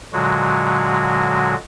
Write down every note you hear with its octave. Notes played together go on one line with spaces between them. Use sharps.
A#2 D3 F#3 G#3 F#4